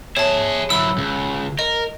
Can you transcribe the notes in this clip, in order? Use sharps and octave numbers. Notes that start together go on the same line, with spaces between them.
G#4 C#5 E5 A5
F#3 E4 E6
C#2
A#4 D#5